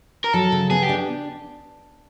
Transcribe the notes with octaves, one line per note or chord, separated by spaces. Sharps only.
A#4
F#3 A4
C#3
B3 G#4
G4
D4